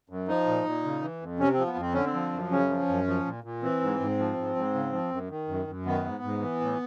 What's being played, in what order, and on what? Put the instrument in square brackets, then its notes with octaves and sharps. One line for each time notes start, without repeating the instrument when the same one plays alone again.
[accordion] F#2
F3 D#4
A#2
A#2
C#3
E3
F2
C3 C#4
F3 C4
B3
F2 C4
D3 C#4
C4
F3
F#2
C#3 C#4
F3
F#2
F3
A#2
A#2
E3 C4
G#2
G#2
F3
G#2
G#2
C#3
F3
F#2
D#3
F#2
F#2
D#3 B3
G#2
G#2
E3
A2